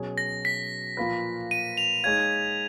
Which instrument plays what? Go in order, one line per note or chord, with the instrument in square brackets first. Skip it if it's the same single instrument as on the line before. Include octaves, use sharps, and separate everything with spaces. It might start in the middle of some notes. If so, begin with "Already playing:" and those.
Already playing: [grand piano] B2 F#3 C#4 G#4
[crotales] A#6
B6
[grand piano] A#2 F3 A#3 F4 B4
[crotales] D#7
F7
[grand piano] G#3 D#4 G#4 C#5 F5 [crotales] G#6